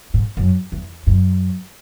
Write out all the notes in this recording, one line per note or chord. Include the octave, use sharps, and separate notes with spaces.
G#2
F#2
E2
F#2